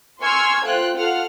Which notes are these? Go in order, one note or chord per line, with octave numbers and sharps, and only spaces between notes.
G#5 C6 C#6 E6 F6 G#6
A3 F4 C5 G5 F#6
F4 A4 F5 F#5 F6